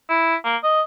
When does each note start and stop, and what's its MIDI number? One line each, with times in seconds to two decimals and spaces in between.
0.09 0.35 64
0.44 0.56 58
0.63 0.82 75